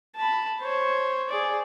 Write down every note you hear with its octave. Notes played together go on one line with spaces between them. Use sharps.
A5 B5
C5 C#5
G#4 D5